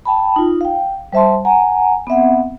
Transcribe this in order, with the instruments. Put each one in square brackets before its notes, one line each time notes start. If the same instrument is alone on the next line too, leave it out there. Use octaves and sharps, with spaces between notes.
[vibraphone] G5 A5 B5
D#4 F4
F5 G5
G3 C5 E5 A5 C6
F#5 G#5 A#5
B3 C4 E5 F#5